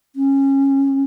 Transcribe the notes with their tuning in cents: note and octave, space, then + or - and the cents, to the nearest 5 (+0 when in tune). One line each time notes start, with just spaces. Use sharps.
C#4 -20